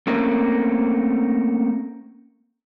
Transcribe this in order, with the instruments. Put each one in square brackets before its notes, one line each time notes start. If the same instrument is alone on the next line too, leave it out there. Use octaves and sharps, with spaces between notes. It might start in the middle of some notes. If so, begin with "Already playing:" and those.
[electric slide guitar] A3 A#3 C4 C#4 A#4